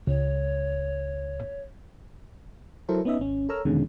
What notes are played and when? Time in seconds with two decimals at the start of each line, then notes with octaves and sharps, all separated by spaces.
0.07 C#2 C#5
2.89 F#3 E4 A4 A#4 C5
3.05 B3 C#4 D#4 D#5 E5
3.20 G#1 C#4
3.49 A4 A#4 C#5 A#5 E6 F6
3.65 E2 B2 D3 D#3 G#3 C#4